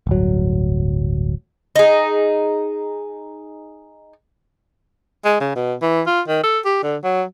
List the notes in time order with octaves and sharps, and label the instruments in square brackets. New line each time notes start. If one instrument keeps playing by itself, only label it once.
[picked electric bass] D1 G1 F#3
[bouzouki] D#4 G#4
[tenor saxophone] G#3
C#3
B2
E3
F4
D#3
A4
G4
D3
F#3